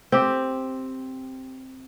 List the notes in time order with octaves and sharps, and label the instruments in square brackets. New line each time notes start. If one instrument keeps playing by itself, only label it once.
[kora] C4 G4